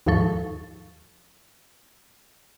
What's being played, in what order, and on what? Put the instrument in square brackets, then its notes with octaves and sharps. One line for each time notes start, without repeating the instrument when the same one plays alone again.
[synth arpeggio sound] D#2 G#2 F3 A4 C#6